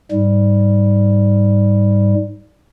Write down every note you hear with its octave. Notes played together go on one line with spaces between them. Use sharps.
G#2 G3